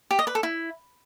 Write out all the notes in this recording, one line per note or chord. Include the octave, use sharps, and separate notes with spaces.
G4
D#5
B4
A4
E4